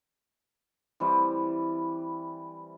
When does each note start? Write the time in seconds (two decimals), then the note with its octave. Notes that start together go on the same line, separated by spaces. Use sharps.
1.00 E3 G3 C4